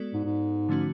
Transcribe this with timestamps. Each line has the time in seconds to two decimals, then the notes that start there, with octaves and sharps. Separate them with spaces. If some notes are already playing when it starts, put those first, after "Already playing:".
Already playing: G#3 B3 F#4 A4 D5
0.14 G#2
0.25 G#2
0.69 D3 F3 A3 C#4 F#4